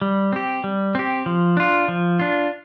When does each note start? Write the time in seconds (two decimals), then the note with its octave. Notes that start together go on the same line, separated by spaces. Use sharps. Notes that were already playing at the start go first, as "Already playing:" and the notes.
0.01 G3
0.32 C4 G4
0.64 G3
0.95 C4 G4
1.26 F3
1.57 D4 F4
1.88 F3
2.19 D4 F4